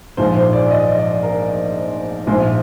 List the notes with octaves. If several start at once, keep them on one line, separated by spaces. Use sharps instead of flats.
A#1 G#2 F3 C5
C5
D5
D#5
D5
A#4
A#1 G#2 F3 C5